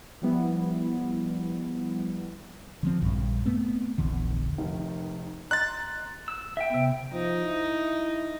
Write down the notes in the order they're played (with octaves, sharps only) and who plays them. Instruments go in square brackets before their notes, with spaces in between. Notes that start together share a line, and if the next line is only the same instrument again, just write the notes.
[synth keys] F3 G3 B3 E4
[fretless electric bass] D3 F3 C4
A#1 G2
A3 B3 C4
D1 A#1 E2 D3
[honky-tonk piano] F1 D#3
[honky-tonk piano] D#5 A#5 C6 [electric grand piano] F#6 A6
[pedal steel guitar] E6
E5 G5
[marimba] C3 B3
[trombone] F3 [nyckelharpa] D#4
[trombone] E4